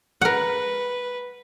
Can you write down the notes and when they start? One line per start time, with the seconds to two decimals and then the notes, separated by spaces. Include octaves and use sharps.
0.21 A#4 B4 F#5